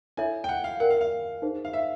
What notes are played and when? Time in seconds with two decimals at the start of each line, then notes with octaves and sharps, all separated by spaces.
0.17 E4 A4 C#5 E5 G#5
0.44 G5
0.49 F#5
0.64 F5
0.80 A#4 D5 F#5 G5
0.90 F5
1.01 F5
1.42 D#4 G#4 C5
1.65 F5
1.73 E5